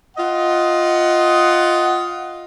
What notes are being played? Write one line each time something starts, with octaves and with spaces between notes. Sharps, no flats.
F4 D#5 F#5